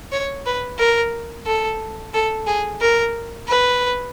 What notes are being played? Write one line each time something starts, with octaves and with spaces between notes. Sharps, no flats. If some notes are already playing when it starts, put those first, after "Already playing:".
C#5
B4
A#4
A4
A4
G#4
A#4
B4